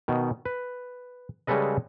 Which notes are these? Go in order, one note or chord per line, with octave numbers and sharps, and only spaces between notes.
B2 D#3
B4
C#3 G3 G#3 A4 B4 D#5